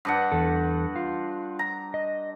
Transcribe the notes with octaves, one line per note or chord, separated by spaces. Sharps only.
G2 D4 F#5
E2 A4
F4
A#5
D#5